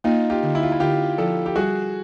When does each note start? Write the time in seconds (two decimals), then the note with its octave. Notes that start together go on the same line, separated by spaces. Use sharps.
0.04 A#3 D#4 F4
0.30 F4 G4
0.43 D3
0.55 E4
0.63 F4
0.72 E4
0.80 D3 F4 G4
1.18 F3 G4 A4
1.46 G4
1.56 G3 F#4 G#4